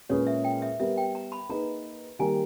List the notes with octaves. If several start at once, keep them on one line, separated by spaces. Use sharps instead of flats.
A#2 G#3 C#4 G#4 B4 C#5
E5
G5
E5
G3 B3 G4 A#4 E5
G5
A#5
B5
A#3 D#4 G#4 B4 A#5
D#3 G3 A#3 G#5